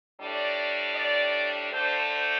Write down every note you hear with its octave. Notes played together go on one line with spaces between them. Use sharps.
A2 G3 D4 D5
D5
D3 A3 D4 C5
C5